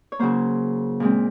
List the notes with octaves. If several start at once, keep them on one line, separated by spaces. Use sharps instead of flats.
C#5
C#3 F#3 A#3 C5
A#2 G#3 C4